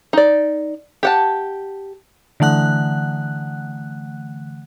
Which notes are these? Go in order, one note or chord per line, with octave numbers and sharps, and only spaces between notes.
D#4 D5
G4 F#5 A5
D3 E3 A3 F#5 F#6